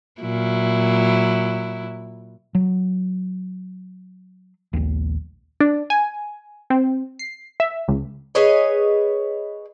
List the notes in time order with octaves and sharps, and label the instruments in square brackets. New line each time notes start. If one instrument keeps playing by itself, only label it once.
[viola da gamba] A#2 F#3 E4
[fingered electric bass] F#3
A#1 D#2
[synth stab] D4
G#5
C4
C7
E5
C#2
[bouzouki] G#4 B4 C#5 D#5